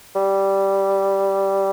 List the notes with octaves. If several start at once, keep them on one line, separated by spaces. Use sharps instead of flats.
G3